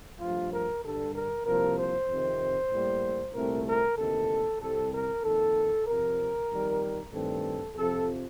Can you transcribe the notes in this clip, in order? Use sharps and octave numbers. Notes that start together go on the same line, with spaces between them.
G2 F3 A3 F4
A#4
G2 D3 G3 A4
A#4
C2 C3 F3 A#3 A#4
C5
F2 C3 D#3
A2 G3 A#3
C2 A#2 A3 C4 A#4
A#4
D2 C3 D#3 A#3 A4
C2 C3 G3 C4 A4
A#4
F2 D#3 A#3 A4
F2 C3 F3 A#4
F2 D#3 G3
G2 D#3 A3 C4 A4
F2 C3 F3 C4 A4